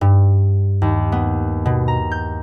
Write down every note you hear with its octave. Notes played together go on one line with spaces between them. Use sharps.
G2
D#2
B3
B2
A#5
G6